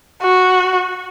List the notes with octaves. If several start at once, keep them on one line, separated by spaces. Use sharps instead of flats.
F#4